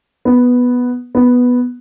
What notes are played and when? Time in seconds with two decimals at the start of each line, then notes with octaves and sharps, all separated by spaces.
0.25 B3
1.15 B3